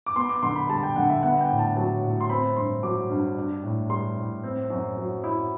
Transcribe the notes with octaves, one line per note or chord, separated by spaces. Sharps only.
D6
B3 C6
D6
D3 C6
B5
G3 A5
G5
D3 F#5
E5
B3 F#5
G5
A2
A5
F#3 A5
A2
C6
C4 B5
G2 C6
F#3 D6
G2
D4
A2
G3 C6
A2
C4
F#2
F#3
E4